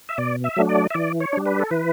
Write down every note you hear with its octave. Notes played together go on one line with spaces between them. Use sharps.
E5
B2 D5
E5
F#3 A3 D4
D5
E5
E3 D5
C#5
G3 D4
B4
A4
E3 B4